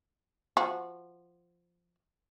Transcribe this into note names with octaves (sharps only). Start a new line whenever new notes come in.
F3 F#4